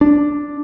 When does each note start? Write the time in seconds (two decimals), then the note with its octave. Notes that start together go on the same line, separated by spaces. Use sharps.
0.01 D4